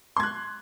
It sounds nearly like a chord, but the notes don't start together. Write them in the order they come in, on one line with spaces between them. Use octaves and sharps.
C6 G#6 F#6